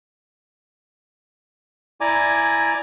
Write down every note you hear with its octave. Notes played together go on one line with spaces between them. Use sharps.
E4 D5 G#5 A#5 D6